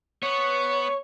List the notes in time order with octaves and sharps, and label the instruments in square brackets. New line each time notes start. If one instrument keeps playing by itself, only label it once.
[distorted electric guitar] B3 [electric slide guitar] C#5 [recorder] C#6